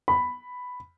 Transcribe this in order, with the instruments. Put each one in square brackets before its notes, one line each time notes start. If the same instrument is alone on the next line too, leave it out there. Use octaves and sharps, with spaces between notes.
[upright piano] B5